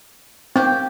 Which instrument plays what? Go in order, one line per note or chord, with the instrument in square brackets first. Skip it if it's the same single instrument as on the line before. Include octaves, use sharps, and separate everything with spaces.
[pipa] A#3 G4 [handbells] C4